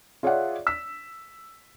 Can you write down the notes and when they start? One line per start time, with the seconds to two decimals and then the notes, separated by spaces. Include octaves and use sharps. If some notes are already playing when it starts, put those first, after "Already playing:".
0.23 F4 G#4 C#5 D5 E5 F#5
0.67 E6 B6